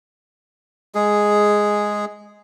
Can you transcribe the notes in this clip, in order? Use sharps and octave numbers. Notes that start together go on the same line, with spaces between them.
G#3 G#4